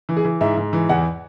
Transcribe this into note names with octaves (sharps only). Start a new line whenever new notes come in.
E3
G#4
E3
G#2 E5
G#2
E3
E2 F#5